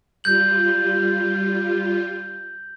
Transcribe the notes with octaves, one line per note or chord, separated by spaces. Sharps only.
G3 F4 G6 F#7